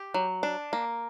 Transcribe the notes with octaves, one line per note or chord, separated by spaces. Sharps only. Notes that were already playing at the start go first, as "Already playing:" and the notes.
Already playing: G4
F#3
D4
A#3